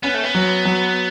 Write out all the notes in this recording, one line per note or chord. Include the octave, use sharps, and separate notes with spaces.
B3 C#4
A3
B3
F#3
F#3